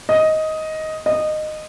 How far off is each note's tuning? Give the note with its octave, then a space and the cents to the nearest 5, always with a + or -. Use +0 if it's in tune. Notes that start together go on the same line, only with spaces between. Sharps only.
D#5 +10
D#5 -15